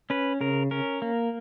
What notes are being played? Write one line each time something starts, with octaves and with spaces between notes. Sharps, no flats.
C#4 B4
C#3 A#4
C#4 A#4
A#3